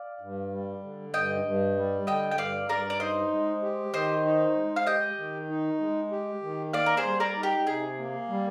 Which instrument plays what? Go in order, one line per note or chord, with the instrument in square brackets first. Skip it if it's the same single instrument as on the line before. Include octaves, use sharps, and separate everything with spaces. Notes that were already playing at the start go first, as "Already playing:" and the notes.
Already playing: [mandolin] D5 F5
[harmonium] G2
G3
D3
[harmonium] G2 [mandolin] D#5 G5
[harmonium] G2
G3
[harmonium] D3 [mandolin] D#5 G5
[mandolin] G5
[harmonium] G2 [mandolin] D5 F5
[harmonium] G2 [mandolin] A#4 D5
[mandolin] D5
[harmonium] D#4 [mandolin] C5 D#5
[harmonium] G#3
G4
[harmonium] D#3 [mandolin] C5 D#5
[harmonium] D#4
G#3
[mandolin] F5
[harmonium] G4 [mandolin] D#5 G5
[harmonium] D#3
D#4
G#3
G4
D#3
[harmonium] A#3 [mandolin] D5 F5
[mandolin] A#4
G#4 C5
[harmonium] G3
[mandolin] A#4 D5
[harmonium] D#4
[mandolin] G4 A#4
[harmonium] C3 [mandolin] G#4
[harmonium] A#3
G3